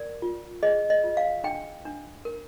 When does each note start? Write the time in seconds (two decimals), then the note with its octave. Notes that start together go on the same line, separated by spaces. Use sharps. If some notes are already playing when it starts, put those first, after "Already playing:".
Already playing: A#4 D5
0.22 F4
0.63 G#4 D#5
0.90 D#5
1.04 F4
1.17 F5
1.44 D4 G5
1.85 D4
2.25 A#4